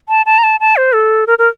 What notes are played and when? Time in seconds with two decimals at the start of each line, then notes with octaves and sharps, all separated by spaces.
0.09 A5
0.26 A5
0.38 A#5
0.43 A5
0.60 A5
0.77 C5
0.94 A4
1.27 A#4
1.39 A#4